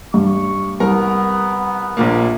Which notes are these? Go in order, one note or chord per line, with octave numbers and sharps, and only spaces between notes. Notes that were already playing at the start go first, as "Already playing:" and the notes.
G2 C#6
C2 B3 A#4 A#5
A#1 A#2 A#3